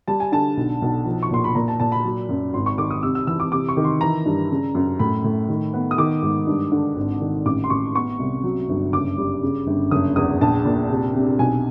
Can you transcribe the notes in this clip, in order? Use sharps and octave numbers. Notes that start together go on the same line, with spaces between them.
G3 A5
G#5
D3 A5
B1
B1
F3
C#6
A#2 C6
B5
A#2 A#5
A5
A#2 A5
B5
F#3
F#2
G#1 C6
C#6
D#3 D6
D#6
C3 E6
E6
E3 E6
D6
C3 D6
C#6
D#3
C6
E3 A#5
G2
C#3
F#2
A2 B5
A2
D#3
B3
D#6
D#3 D6
G#2
G2
D3
G#1
D#3
A1 D6
C6
A1 C#6
B3 C#6
C2
F#3
G1
F#1 D6
G3
C#3
G1
F#1 D#6
E2 D#6
A#1 A5
A#2
C3
C3
B1 G#5